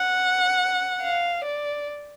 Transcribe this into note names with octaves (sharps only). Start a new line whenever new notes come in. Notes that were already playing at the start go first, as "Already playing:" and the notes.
Already playing: F#5
F5
D5